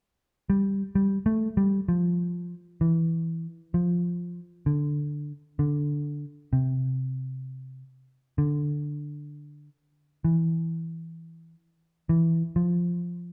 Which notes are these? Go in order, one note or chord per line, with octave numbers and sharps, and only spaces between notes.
G3
G3
A3
G3
F3
E3
F3
D3
D3
C3
D3
E3
E3
F3